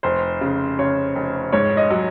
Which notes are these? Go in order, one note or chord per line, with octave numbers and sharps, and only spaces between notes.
F1 C5
C#3
C#3 C#5
F1
G#2 C#5
D#5
F#3